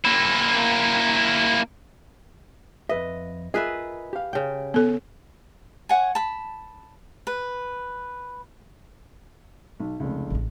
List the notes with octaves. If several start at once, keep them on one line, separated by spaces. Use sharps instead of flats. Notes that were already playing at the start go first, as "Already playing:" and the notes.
A#3 E4
F2 B4 D#5 E5
F4 G#4 A#4 B4 D#5 E5
G4 F5
C#3 G5
B3 A4
C#5 F#5 G#5
A5 B5
B4
B1
F1 C#2
A1 G#3